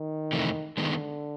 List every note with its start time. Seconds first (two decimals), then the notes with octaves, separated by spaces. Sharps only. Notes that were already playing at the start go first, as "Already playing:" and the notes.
Already playing: D#3
0.33 F2 C3 E3 A3
0.77 D3 D#3 G#3 B3